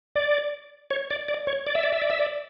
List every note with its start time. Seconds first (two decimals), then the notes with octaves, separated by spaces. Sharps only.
0.16 D5
0.91 C#5
1.10 D5
1.28 D5
1.47 C#5
1.67 D5
1.75 E5
1.83 D5
1.93 E5
2.02 D5
2.10 E5
2.20 D5